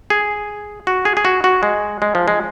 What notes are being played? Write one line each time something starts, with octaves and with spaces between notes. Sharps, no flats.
G#4
F#4
G#4
G#4
F#4
F#4
G#3
G#3
F3
G#3